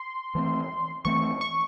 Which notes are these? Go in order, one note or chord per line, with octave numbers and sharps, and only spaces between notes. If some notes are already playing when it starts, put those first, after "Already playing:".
Already playing: C6
E3 A3 C4
E3 A3 C4 C#6
C#6